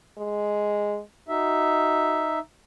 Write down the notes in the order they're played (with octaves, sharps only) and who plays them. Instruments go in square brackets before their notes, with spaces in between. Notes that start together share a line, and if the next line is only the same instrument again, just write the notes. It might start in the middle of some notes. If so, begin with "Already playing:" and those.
[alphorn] G#3
[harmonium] D#4 E5 [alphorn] F#4